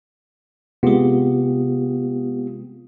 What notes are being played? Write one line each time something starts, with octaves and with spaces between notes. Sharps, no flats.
C3 G#3 B3 F4 G4